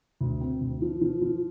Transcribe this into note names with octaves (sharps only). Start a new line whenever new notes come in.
D2
C4
D2
F3
F3
F3